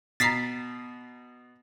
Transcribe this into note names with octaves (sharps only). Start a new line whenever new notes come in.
B2 A#5 A6 B6 C7